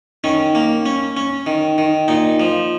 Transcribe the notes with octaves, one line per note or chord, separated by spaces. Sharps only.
D#3 C#4
A#3
C#4
C#4
D#3
D#3
A#2 D#4
F3